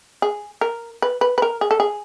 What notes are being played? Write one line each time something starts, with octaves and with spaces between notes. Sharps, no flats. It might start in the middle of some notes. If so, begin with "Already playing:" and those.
G#4
A#4
B4
B4
B4
A#4
G#4
A4
G#4